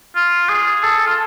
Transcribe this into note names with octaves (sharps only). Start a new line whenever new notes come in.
F4
G#4
A4
F4